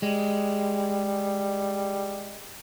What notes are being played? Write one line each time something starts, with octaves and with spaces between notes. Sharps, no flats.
G3 G#3